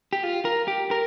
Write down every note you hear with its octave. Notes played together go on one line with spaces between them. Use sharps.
G4
F4
A#4
G4
A#4